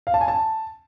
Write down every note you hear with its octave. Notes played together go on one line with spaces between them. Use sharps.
F5
A5
G#5
A5